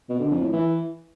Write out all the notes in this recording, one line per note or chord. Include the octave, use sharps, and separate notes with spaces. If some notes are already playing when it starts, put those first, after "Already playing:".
B2
D3
F2
A2
E3